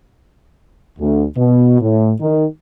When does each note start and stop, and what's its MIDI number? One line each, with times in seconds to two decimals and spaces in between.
0.99 1.23 38
1.36 1.80 47
1.80 2.11 45
2.20 2.44 51